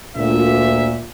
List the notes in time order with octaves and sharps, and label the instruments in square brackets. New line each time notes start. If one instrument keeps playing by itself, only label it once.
[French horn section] D2 A#2 [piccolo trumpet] E5